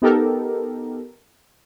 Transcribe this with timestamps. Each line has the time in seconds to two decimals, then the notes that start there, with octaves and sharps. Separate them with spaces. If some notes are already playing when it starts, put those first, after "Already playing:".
0.02 B3 D#4 G4 A4 A#4